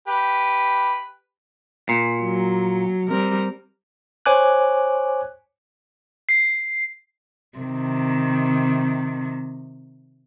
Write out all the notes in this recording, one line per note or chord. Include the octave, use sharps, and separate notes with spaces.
G4 B4
A#2
F#3
G3 C4 A#4
C5 C#5 G#5 D6 F#6
C7
C3 D#3